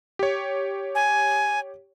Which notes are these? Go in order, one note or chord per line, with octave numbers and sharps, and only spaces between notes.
G4 C#5
G#5